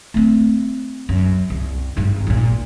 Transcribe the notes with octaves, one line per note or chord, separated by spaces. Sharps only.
A3 C4
F#2
C2
G#1 G2
A#1 A#2